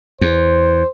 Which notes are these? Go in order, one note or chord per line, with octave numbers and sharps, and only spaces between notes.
E2 C5